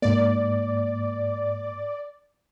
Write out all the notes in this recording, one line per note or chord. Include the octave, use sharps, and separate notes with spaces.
G#2 A#3 D5